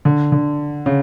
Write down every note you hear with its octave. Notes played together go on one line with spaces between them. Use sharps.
D3
D3
C#3